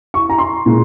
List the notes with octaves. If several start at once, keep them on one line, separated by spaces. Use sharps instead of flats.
C#6
A#5
C6
A#2 G#3